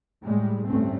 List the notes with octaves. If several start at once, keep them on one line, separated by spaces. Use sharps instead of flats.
A2 G3 G#3
A1 D2 G2 A3 C4 C#4